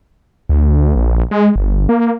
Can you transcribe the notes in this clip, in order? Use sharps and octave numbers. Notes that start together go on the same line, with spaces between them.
D2
A#1
G#3
G1
A#3